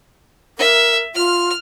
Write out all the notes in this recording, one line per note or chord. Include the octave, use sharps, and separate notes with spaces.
A#4 E5
F4 F6